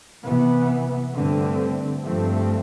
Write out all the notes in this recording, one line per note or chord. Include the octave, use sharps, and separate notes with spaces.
C3 E3 B3
G2 D3 A3 C4
G2 F3 A3 C4